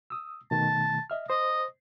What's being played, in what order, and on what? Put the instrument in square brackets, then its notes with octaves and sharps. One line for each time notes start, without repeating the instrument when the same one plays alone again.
[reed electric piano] D#6 E6
[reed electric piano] B2 D#3 A3 [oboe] A5
[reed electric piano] D#5 E5 F6
[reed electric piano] C5 [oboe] D#5